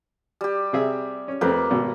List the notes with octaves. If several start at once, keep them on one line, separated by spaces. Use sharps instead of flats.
G3 G4
C3 G#4 E5
C#4
F2 A3 A#3 C4 B4
G#1 B2